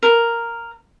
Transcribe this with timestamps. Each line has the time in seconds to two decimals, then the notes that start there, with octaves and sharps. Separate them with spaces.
0.03 A#4